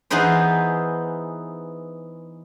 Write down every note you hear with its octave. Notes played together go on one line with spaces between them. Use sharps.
E3 B3 D#4 G#4 B4 C5